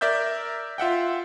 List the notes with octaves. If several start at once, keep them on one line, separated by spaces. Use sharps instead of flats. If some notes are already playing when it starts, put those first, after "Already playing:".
A#4 D5 E5 E6 G6
F4 E5 F#5 G5